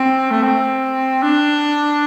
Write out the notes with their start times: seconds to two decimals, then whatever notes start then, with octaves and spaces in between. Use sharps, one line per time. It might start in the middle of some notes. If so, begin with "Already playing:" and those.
Already playing: C4
0.31 A3
0.42 C4
1.23 D4